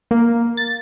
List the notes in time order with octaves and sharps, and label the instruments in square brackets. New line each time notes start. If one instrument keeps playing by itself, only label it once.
[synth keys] A#3
A6